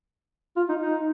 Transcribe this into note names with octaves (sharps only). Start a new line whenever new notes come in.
F4
D#4
D#4